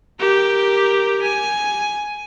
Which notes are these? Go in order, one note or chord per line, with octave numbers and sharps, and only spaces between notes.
G4 A#4
G#5